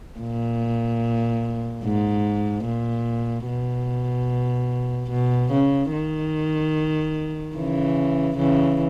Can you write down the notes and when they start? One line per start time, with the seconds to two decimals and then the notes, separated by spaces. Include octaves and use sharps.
0.20 A#2
1.84 G#2
2.65 A#2
3.47 B2
5.10 B2
5.51 C#3
5.92 D#3
7.56 C#3 E3
8.37 C#3 E3